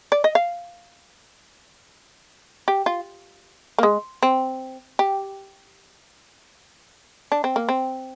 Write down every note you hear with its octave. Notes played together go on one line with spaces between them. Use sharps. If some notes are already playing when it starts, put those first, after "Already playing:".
D5
D#5
F5
G4
F4
A#3
G#3
C4
G4
D4
C4
A#3
C4